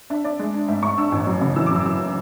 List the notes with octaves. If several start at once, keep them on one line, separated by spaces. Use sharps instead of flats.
D4 E5
D4 D5
G#3
D4
G#2 E5
G#2 C#6
D4 E6
A1
F#2
C#3
E3 E6
F#2 D6
E6
F#2 E6